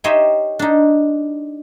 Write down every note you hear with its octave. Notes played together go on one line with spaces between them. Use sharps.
D#4 G4 C5 C#5 D#5 E5
D4 D#4